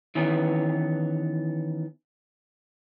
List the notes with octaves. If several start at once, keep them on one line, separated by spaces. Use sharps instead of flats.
D#3 E3 B3 C#4 E4 G#4